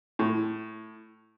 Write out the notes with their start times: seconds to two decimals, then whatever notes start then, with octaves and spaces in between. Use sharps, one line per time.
0.19 A2